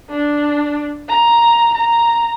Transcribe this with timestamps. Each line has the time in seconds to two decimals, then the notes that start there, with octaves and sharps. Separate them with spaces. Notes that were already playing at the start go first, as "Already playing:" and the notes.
0.10 D4
1.08 A#5
1.75 A#5